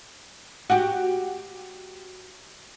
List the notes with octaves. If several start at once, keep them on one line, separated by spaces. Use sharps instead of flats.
F#4 G4